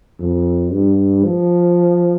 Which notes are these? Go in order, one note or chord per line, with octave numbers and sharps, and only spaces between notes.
F2
G2
F3